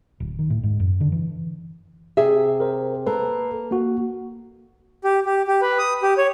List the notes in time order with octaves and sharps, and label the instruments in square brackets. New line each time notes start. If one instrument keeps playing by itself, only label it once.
[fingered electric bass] D1
D#3
A2
G#2
F#2
D3
E3
[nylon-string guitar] C3 G#4 E5
[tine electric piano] A#4 C5
[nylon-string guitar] A#3 [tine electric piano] A4 B4
[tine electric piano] A#3 F#4
[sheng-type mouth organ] G4
G4
G4
B4
D#6
G4
C#5